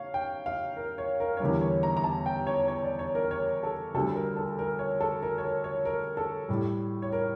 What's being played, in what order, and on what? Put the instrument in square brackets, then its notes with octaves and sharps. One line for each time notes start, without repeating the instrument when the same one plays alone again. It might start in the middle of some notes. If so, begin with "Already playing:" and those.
Already playing: [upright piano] C#5 F5
G5
F5
A#4
C#5
A#4
C#5
E2 D3 G3 A#4
C#5
A#5
A#5
A5
G5
C#5
C#5
D5
C#5
A#4
C#5
A4
D2 D3 G3 A4
A#4
A4
A#4
C#5
A4
A#4
C#5
A#4
C#5
A#4
A4
A2 G3
C#5
A#4